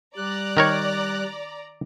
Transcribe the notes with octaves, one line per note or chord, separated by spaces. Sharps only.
G3 D5 A#5 F#6
D#3 A#4 C#5